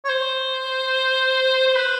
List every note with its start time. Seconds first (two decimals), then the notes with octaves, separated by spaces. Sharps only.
0.05 C#5
0.09 C5
1.67 C5
1.75 B4